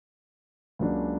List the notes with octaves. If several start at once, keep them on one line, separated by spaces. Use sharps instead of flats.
C#2 C#3 F#3 A#3 D4